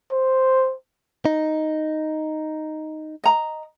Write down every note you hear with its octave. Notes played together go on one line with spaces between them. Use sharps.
C5
D#4
D#5 A#5